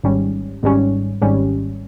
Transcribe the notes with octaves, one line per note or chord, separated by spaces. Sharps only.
G#1 G#2 G3 C#4
G#1 G#2 G3 C#4
G#1 G#2 G3 C#4